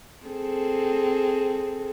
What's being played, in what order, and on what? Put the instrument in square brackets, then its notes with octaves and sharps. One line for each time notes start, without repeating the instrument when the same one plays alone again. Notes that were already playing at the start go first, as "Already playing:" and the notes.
[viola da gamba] C4 G#4 A4